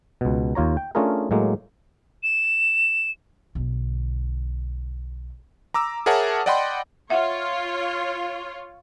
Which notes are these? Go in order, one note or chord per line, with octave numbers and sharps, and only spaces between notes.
C#2 B2
D#2 F4 C#5 A#5
G5
A3 C#4 D4 F4 G#4 A#4
A2 F#3 G#3 A#3
E7
B1 D3
A#5 D6 E6
G#4 A#4 C#5 E5 F#5 A5
D5 D#5 F#5 G5 B5 C6
F4 C#5 E5 F#5